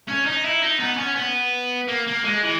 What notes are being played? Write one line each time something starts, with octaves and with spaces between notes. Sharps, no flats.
C#4
D#4
E4
D#4
B3
C#4
B3
A#3
A#3
G#3
E3